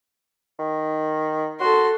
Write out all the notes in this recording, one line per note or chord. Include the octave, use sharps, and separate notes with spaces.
D#3
F#4 A4 C6